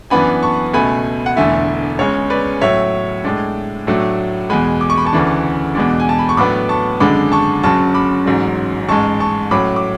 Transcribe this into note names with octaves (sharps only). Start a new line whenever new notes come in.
F#2 E3 B3 D4 G#5 B5
A5 C#6
C#2 B2 A3 G#5 B5
F#5
E1 E2 D3 A3 E4 E5 G#5
C#2 C#3 G#3 C#5
B4 D5
A2 F#3 C#4 C#5 E5
A2 G#3 D4
A2 F#3 A3 D4
E2 B2 G#3 G#5 B5
D6
C#6
B5
A5 C#6
D2 C#3 E3 A3 D4
E2 B2 G#3 D4
G#5
A5
B5
C#6
A2 F#3 B3 D4 B5 D6
A5 C#6
G#1 F#2 D3 G#3 D4 B5 D6
A5 C#6
F#1 F#2 C#3 F#3 A5 C#6
B5 D6
A1 G#2 F#3
A1 G#2 G#3 A5 C#6
A5 C#6
A2 F#3 C#4 B5 D6
D6